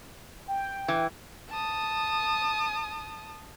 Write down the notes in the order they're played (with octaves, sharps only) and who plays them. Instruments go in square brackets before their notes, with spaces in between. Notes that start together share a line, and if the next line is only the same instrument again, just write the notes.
[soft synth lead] G5
[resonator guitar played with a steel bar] E3
[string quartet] A5 D#6